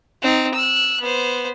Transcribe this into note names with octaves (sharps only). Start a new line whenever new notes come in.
C4 D#4
E6 F#6
B3 C5